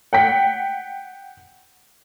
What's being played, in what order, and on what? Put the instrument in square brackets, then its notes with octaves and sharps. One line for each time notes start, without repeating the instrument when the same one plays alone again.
[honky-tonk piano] F#5 G5 B6